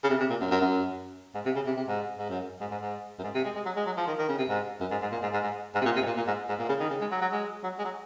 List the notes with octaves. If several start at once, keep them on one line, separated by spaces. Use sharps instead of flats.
C#3
C3
C3
A#2
F#2
F#2
F#2
G#2
C3
C#3
C3
C3
G#2
G#2
F#2
G#2
G#2
G#2
F#2
G#2
C3
G#3
G#3
F#3
G#3
F#3
F3
D#3
D#3
C#3
C3
G#2
F#2
G#2
G#2
A#2
G#2
G#2
G#2
G#2
C3
A#2
C3
G#2
A#2
A#2
G#2
G#2
A#2
C#3
D#3
C#3
G#3
F#3
F#3
G#3
F#3
G#3
F#3